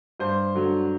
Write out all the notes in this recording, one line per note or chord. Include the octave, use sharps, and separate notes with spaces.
G2 C5
D3 F#3